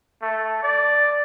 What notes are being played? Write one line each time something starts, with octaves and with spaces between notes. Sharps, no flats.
A3
D5